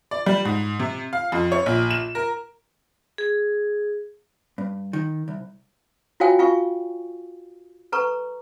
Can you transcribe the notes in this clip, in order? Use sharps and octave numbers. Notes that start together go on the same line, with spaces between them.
D5
G3
G#2
C3
F5
F2
C#5
A#1
E7
A#4
G#4
G2
D#3
C2
F4 F#4 C#5 F5 G5 G#5
F4 F5 G#5 C#6
A4 B4 A#5 C#6